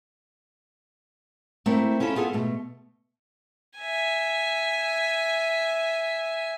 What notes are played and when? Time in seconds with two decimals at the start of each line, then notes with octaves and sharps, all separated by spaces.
1.66 A3 A#3 C4 E4
2.00 C#4 E4 F4 A4
2.15 B3 F4 G#4 A4
2.33 B2 A3
3.79 E5 G#5